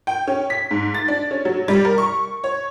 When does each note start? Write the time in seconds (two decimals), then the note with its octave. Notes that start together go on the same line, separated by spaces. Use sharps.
0.07 G5
0.27 C#4
0.50 B6
0.71 G#2
0.94 A6
1.08 D4
1.31 C#4
1.45 F#3
1.68 G3
1.85 A#4
1.98 C#6
2.44 C#5